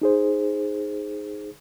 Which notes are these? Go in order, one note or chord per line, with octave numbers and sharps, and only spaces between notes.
D#4 G#4 C5